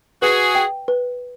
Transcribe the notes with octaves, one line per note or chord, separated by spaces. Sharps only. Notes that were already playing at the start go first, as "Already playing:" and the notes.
F#4 G#4 B4
G5
B4